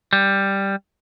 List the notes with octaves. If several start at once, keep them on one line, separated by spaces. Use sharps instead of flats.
G3